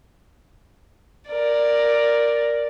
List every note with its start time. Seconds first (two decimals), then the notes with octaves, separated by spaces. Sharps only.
1.29 A#4 D5